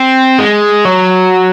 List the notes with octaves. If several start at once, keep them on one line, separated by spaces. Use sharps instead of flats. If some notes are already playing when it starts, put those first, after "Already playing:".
Already playing: C4
G#3
F#3